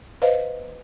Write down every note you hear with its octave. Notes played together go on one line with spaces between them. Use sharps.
B4 C5 D#5 F5